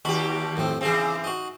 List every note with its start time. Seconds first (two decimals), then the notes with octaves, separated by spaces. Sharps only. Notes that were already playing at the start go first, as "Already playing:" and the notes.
0.05 D#2 F#4 G4 B5
0.57 F2 A2 C4
0.81 C#3 E3 C4 D#4 G#4
1.24 D#4 F#4